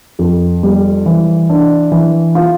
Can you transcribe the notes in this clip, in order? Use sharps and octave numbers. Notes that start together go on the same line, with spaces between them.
F2
G3
E3
D4
E3
F4